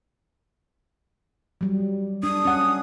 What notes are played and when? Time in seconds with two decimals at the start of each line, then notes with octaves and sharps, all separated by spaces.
1.61 F#3 G3
2.23 D4 D#6
2.45 C#4 F#5